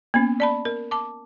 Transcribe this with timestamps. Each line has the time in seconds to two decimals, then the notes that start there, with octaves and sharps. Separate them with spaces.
0.14 A#3 B3 C#4
0.40 D5 A5 B5
0.65 A#4
0.91 A5 D6